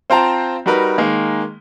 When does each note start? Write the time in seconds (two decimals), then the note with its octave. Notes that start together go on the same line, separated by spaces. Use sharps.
0.10 C4 F4 C5 G5 A5 A#5
0.66 G3 D#4 F#4 A#4 B4
0.98 D#3 G#3 A#3